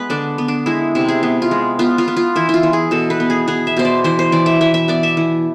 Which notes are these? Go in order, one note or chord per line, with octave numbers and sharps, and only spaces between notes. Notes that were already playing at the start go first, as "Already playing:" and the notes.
Already playing: G#3 B3 B4
D3 D4
B3
D4
G#3 E4
C3 E4
G#4
B3
F4
G#3
B3 F4
F4
B3
F4
E3 E4
E4 F4
E3
G#4
B2 A4
B4
B3
G#4
B3 G#4
E5
B2 C5
D5
E3 C5
C5
E3 D5
E5
E3 E5
E5
B3 D5
E5
E3